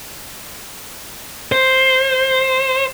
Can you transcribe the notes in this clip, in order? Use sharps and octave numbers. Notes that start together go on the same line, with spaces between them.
C5